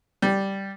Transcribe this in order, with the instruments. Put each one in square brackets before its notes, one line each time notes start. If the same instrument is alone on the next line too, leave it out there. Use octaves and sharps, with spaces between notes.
[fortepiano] G3